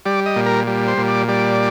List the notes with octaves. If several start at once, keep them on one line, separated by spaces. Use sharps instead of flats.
G3 D5
D#5
A#2
A#4
G3
C5
A#2
D5
G3 D5